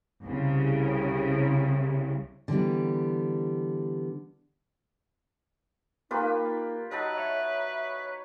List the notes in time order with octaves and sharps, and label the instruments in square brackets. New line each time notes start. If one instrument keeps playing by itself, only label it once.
[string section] C2 C#3
[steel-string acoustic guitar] D3 E3 G3 B3
[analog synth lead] A#3 [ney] D#4 [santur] F4 G4 B4
[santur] F#3 D#4 A5 [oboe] B4 [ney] D#5
[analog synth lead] C#5 [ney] E5